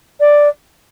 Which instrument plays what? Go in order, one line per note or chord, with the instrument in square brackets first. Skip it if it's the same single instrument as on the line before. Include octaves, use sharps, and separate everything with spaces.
[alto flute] D5